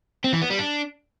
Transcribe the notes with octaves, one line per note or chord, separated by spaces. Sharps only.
C4
E3
B3
G3
D4